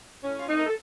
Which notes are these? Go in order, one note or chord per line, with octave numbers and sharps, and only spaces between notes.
A2 C#4
F4
A3 C4 D#4
A#4
A4